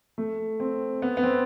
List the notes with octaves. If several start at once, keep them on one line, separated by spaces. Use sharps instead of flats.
A3
C4
B3
B3
C4